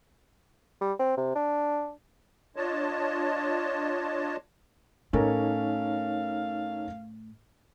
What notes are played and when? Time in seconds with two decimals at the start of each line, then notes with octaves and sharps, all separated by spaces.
0.81 G3
0.99 C4
1.17 C3
1.35 D4
2.56 D4 F4 C#5 D#5 A5
5.13 A2 C#4 D#4 A4 A#4 C#5 F5